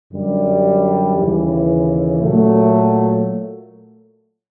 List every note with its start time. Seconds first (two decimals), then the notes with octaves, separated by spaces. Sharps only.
0.13 F#2 D3 G3
1.17 D#2 C#3 E3
2.21 A#2 F#3 A3